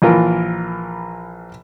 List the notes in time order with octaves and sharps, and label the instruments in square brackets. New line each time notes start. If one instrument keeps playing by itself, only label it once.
[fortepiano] A#1 E3 F4 A#4